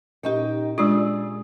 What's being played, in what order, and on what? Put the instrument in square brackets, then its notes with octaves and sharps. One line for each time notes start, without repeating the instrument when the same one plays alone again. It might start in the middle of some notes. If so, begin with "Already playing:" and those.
[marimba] A#2 C#4 G4 [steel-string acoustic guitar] D#4 D#5 G5
[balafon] G#3 D4 F4 [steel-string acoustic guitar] G#4 D5 [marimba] D#6 E6